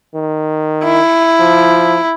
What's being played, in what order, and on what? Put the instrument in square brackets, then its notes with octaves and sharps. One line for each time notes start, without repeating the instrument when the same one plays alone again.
[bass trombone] D#3
[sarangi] E4
[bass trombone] F3